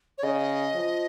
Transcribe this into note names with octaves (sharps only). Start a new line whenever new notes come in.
C#5
C#3 D#5
F3